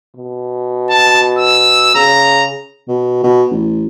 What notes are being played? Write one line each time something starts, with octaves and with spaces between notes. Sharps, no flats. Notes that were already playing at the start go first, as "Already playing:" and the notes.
B2
A5
E6
C#3 A#5
B2
B2
A1